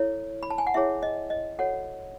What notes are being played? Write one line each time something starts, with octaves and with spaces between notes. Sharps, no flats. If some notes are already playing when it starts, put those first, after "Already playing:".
Already playing: E4 A4 C#5
B5
A5
G#5
F#5
E4 G#4 C#5 E5
D#5
D#5
F#4 A4 C#5 F#5